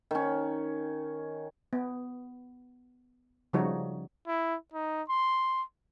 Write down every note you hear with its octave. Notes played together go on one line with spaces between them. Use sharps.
D#3 C#4
B3
C#3 F3 G3 D#4 F#4 C#5
E4
D#4
C6